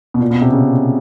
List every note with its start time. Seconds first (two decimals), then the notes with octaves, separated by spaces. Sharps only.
0.14 B2
0.20 A#2
0.31 B2
0.41 C3
0.52 C#3